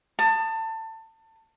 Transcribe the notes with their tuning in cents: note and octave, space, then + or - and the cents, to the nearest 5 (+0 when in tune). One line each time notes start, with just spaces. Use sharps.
A5 +25 D#6 -20